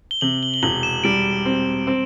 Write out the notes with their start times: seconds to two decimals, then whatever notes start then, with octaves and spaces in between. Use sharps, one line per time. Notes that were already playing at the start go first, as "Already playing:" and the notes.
0.11 G7
0.21 C3 F#7
0.43 G7
0.54 G7
0.63 E1 F#7
0.83 E7
1.04 G3 D7
1.46 C4
1.87 C4